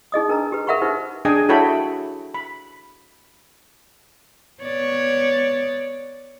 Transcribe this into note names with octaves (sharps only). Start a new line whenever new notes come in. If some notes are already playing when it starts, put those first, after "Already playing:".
D#4 G#4 D#5 D#6
D4 A#4 B4 A#5
G4 B4
G#4 A#4 E5 F#5 B5 C#6
D#4 G4 B4 C5
D4 G#4 D#5 G5 G#5
E4 F#4 A4 C#5 G5 B5
B5
B3 C#5 D5